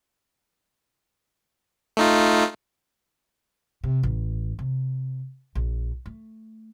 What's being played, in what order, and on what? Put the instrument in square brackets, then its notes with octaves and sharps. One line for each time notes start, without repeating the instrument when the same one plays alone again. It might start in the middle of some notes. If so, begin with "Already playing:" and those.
[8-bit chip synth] A3 D#4 F4
[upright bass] C3
A1
C3
A#1
A3